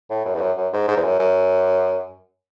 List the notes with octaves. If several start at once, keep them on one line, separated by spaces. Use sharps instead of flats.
A2
F#2
E2
F#2
F#2
G#2
G#2
E2
F#2
F#2